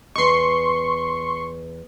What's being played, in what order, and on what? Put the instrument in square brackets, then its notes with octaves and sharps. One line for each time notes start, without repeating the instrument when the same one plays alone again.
[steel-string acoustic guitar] E2 D#5 [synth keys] C6 C#6